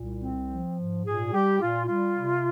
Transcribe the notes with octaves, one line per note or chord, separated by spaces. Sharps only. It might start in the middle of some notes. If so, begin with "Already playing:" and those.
Already playing: C2 A#2
C4
F3
G#2
A#2 G#4
G3 G4
A#2 F4
G3 F4
C3